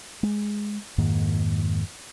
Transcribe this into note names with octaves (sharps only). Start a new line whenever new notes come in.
G#3
F2 G#2 D#3 A#3